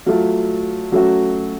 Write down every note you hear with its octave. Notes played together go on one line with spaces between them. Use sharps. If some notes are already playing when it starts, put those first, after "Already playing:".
F#3 A3 F4
F#3 A3 C#4 F#4